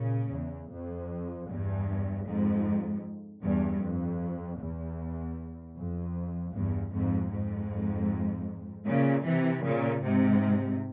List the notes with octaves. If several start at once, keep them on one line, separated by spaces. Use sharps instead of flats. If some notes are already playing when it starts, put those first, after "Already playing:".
Already playing: A#2 C#3
E2
F2
E2 G2
F2 G#2
E2 G2
F2
E2
F2
E2 G2
F2 G#2
F2 G#2
A#2 C#3
C3 E3
A#2 C#3
G#2 C3